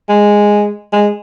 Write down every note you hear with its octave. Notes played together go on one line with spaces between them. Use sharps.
G#3
G#3